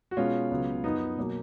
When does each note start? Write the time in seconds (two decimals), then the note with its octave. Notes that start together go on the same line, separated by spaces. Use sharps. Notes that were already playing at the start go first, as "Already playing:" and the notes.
0.11 F#4
0.17 B2 G#3 B3 C#4 F4
0.50 C#2 C#3 F#3 B3
0.84 F#2 F3 B3 D#4
1.17 B2 F#3 A#3